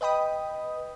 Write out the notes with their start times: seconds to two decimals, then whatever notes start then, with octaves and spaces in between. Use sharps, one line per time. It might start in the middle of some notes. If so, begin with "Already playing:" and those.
0.01 B4 D#5 G5 B5 D#6